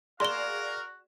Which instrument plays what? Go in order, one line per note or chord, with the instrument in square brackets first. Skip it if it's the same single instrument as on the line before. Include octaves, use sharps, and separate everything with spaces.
[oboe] F#4 [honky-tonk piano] G#4 D5 E7 [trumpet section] A#4 F5 [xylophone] C6 G7